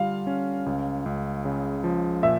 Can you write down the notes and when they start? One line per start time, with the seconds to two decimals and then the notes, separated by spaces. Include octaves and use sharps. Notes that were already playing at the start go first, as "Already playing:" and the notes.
Already playing: D3 G3 F4 F5
0.27 C#4
0.66 C#2
1.06 C#2
1.45 C#3
1.84 F3
2.23 A#2 E5